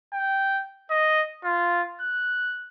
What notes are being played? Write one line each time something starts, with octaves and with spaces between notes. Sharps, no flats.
G5
D#5
F4
F#6